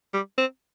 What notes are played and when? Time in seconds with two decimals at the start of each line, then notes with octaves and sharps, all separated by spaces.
0.13 G3
0.38 C4